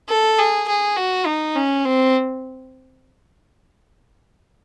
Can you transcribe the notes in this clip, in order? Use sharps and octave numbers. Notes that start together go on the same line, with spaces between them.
A4
G#4
G#4
F#4
D#4
C#4
C4